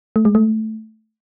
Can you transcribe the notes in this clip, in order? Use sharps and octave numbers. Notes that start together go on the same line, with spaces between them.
A3
G#3
A3